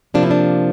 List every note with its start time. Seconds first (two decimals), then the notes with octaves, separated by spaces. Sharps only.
0.14 C3 F3 A#3 D4
0.23 E4
0.31 D4